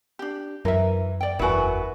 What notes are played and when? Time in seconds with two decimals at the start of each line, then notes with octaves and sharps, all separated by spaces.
0.19 D4 G4
0.65 F#2 E3 A#4 E5
1.21 D5 G5
1.39 F#1 E2 B3 E4 F#4 A#4 B4 G#5